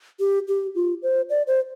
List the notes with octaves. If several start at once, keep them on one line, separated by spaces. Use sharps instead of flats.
G4
G4
F4
C5
D5
C5